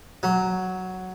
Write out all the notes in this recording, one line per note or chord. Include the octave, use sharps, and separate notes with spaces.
F#3